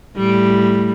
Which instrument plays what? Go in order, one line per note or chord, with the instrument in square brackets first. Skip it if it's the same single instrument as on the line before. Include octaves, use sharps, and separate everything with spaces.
[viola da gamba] A2 G3